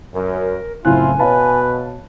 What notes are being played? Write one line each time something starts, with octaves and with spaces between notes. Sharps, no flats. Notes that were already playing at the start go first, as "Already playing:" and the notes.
F#2 A#4
F#1 A2 C4 E4 F4 G#5 F#6
B2 B4 C#5 F5 A5